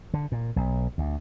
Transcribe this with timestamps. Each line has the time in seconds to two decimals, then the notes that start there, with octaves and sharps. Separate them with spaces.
0.14 D3
0.32 A#2
0.56 B1
0.98 D2